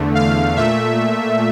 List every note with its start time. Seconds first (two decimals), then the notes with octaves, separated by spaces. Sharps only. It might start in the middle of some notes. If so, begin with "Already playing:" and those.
Already playing: E2 D3 A3
0.15 F5
0.57 A#2 A3 E5